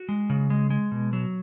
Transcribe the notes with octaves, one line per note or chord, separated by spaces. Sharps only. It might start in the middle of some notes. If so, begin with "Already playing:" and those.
Already playing: F#4
G#3
C#3
G#3
G#3
B2
F#3